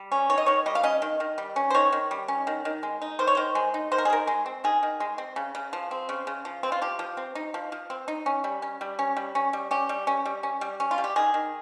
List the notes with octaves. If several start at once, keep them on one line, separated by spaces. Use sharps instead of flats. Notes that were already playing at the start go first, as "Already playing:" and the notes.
Already playing: G3
C#4
D#3 C#5
D#5
D#3 C#5
G3 D#5
F5
C#4 D#5
D#3
D#3
G3
C#4
C5
D#3 C#5
D#3
G3
C#4
D#3
D#3
G#3
D#4
D#3 C5
C#5
D#3 C5
G#3
D#4
D#3 C5
A#4
G#4
D#3 A#4
G#3
C4
D#3 G#4
D#3
G#3
C4
C#3
C#3
F3
C4
C#3
C#3
F3
C4
F4
F3 G4
F3
C4
D#4
F3
F3
C4
D#4
C#4
G3
C#4
G3
C#4
G3
C#4
G3
C#4 G4
G3
C#4
G3
C#4
G3
C#4
F4
G3
G4
D#3 G#4
D#3